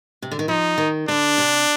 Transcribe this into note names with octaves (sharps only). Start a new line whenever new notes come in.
C3
D3
D#3
F3 D#4
D#3
D3 D4
C3